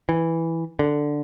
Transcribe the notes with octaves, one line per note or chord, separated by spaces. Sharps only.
E3
D3